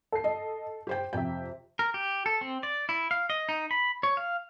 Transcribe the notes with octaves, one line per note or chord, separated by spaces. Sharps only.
A4 C7
D#5
G4 C5 G5
F2 C3 E5 G5
A#4
G4
A4
C4
D5
E4
F5
D#5
D#4
B5
C#5
F5